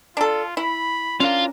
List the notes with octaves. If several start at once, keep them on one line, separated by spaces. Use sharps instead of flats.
D4 F4 A4
E4 B5
C#4 D4 F4 A#4 F5